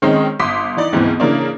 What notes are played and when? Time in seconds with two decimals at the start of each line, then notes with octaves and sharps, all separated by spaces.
0.02 D#3 G#3 C4 C#4 D#4
0.39 G1 C6 D6 D#6 B6
0.77 E3 D#4 D5
0.93 D2 G#2 B2 E3 C4
1.20 C#3 E3 A#3 D4